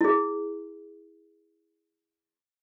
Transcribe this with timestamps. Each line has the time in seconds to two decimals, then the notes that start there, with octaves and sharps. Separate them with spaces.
0.01 E4 G#4